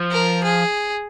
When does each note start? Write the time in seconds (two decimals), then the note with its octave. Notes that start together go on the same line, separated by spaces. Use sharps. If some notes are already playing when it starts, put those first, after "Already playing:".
Already playing: F3
0.12 A#4
0.43 G#4